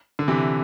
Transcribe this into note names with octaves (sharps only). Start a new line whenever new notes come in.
D3
C3 E3